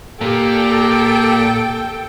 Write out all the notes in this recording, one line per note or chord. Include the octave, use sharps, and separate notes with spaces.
A#2 A#3 G4 A4 G5